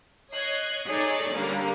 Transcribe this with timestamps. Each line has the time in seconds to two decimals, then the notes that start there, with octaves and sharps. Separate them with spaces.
0.32 C#5 D#5 F#6 G#6 C7
0.89 D#4 G#4 A4 C#5 D5
1.33 D3 G3 A#3 C#4